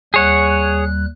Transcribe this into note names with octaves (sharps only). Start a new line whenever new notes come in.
D#2 G3 G#4 C#5 F#5 F#6